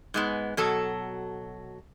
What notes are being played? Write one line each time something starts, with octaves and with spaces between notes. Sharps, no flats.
G#2 G#3 B3
B2 F#3 A4 A5